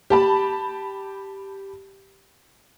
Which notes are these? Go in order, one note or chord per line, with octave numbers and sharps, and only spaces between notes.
G4 A5 B5